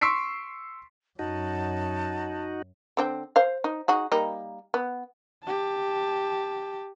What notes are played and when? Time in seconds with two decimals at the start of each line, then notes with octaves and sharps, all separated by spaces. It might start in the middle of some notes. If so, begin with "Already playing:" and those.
0.01 C6 C#6 E6 B6 C7 D7
1.19 F#2 D#4 F#4 A5
2.97 D3 C4 G5
3.36 C5 F5
3.64 D#4
3.88 D#4 F#4 G#4
4.12 G3 A#3 D#4
4.74 B3
5.44 G4 A5